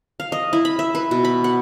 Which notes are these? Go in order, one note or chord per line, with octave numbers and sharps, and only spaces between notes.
F5
D#5
E4
B5
E5
B4
B2
B5
F#5